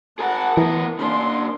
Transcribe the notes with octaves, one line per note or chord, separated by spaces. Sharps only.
G#4 A#4 F#5 A5
E3 B3 A#4
C#3 A#3 D4 C6